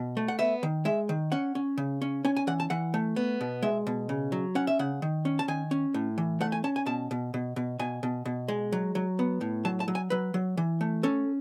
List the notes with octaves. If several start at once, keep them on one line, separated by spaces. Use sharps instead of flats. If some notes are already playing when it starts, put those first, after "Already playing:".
Already playing: B2
A3
F#5
B3 E5
D#3
G#3 E5
D#3
C#4 F#5
C#4
C#3
C#4
C#4 G#5
G#5
E3 F#5
A5
E3 F#5
A3
B3
B2
G#3 E5
B2
C#3
F#3
C#4 F#5
E5
C#3 F#5
D#3
C#4
A5
D#3 G#5
C#4
A2
E3
A3 F#5
G#5
C#4 A5
G#5
B2 A5
B2
B2
B2
B2 G#5
B2
B2
G#3
F#3
F#3
B3
A2
F#3 A5
A5
F#3
G#5
F#3 B4
F#3
E3
A3
C#4 A4